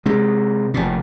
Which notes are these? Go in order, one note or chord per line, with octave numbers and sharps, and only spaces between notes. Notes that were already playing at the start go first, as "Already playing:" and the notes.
C3 G#3
F1 A#2